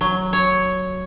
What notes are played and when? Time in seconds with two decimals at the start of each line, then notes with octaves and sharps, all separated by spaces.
0.01 F#3
0.33 C#5